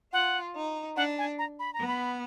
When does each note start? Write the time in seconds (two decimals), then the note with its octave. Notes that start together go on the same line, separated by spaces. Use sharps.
0.13 F4 F#5
0.55 D#4
0.97 D4 F#5
1.18 G#5
1.38 A#5
1.59 B5
1.74 A#5
1.80 B3
1.87 B5